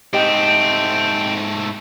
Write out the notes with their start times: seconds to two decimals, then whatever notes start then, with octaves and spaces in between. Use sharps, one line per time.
0.13 G#2 A3 C4 G4 D#5 G5